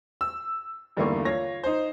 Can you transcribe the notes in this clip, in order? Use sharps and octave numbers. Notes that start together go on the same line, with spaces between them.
E6
E2 G2 D3 D#3 A3 A#3
F4 C#5 A#6
D#4 C5